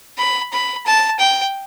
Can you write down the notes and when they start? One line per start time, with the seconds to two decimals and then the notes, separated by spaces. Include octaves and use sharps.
0.18 B5
0.53 B5
0.86 A5
1.19 G5